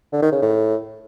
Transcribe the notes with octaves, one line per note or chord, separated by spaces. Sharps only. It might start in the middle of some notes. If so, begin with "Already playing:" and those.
D3
D#3
C#3
A2